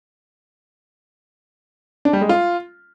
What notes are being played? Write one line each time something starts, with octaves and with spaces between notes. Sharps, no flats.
D4
G3
G#3
F4